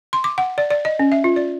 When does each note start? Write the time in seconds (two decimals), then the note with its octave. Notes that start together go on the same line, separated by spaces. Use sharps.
0.13 C6
0.24 D6
0.38 F#5
0.58 D5
0.70 D5
0.85 D#5
0.99 C#4
1.12 E5
1.24 F4
1.36 D5